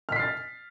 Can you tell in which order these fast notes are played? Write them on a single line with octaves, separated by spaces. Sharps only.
F6 B6 C7 A6